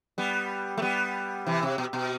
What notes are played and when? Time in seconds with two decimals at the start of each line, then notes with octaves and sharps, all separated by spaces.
0.18 G3 B3
0.78 A3
0.82 G3 B3
1.46 C3 E3
1.62 C3
1.78 B2
1.93 B2